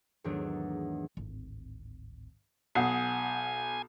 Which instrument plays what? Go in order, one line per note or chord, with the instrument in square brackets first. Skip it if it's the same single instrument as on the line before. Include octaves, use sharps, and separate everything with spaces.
[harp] E2 G#2 D#3 F#3 A3 D4
[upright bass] D1 G#1
[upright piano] B1 [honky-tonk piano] F#5 D#6 C7 [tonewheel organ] G#5